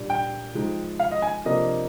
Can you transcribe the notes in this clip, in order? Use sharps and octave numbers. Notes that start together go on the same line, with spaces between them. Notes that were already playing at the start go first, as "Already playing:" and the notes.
Already playing: A#2 G3 D4
G5
F3 G#3 D#4
F5
D#5
G#5
C3 F3 A#3 D4 D#5